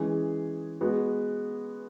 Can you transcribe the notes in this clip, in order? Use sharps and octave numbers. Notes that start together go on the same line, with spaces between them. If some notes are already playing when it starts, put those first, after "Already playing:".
Already playing: E3 G#3 C#4 G#4
G#3 B3 F#4